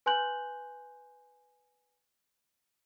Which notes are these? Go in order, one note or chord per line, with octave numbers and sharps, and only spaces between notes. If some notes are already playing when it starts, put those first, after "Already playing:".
B4 G#5 C6 F#6 G6 F#7